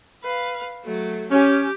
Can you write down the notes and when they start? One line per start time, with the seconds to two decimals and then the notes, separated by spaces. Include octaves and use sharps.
0.23 B4 F5
0.84 F#3 A3
1.31 C#4 G4